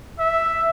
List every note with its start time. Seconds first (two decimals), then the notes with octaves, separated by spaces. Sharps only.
0.19 E5